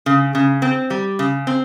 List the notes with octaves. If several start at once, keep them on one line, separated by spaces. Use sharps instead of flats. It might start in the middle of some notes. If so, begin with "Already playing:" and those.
C#3
C#3
C4
G3
C#3
C4